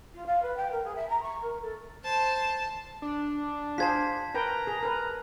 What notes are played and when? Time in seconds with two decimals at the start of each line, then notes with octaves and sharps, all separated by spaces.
0.14 F4
0.26 F5
0.42 B4
0.56 G5
0.71 A#4
0.84 G#4
0.95 E5
1.09 A#5
1.22 C#6
1.42 A#4
1.61 A4
2.04 C5 A5
3.02 D4
3.78 F4 G#4 C5 A5 G#6 B6
4.34 A#4 B4 G5 A#5
4.67 G#4
4.83 A#4 B4